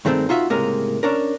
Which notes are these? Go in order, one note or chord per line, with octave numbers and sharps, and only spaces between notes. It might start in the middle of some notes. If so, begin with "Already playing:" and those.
G2 D#3 G#3 A3 C4
D#4 F4 F#4 E5
C#2 A2 C3 G#3 A#3 A#4
C#4 D4 A#4